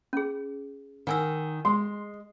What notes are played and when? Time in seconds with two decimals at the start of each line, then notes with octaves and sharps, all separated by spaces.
0.13 C#4 G#4
1.07 D#3 F#5 G#5 E6
1.65 G#3 C6